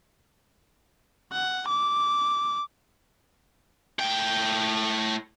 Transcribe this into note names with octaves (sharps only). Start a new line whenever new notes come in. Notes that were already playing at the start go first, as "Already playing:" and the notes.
F#5
D6
A2 G5